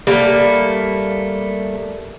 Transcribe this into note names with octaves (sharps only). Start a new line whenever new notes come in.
G3 A3 A#3